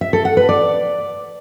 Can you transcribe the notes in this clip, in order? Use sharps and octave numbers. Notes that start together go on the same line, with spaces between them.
E5
A4
F#5
B4
D5